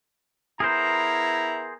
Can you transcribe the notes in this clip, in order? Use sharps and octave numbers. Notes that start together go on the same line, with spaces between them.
B3 E4 G#4 A#4 C5 A#5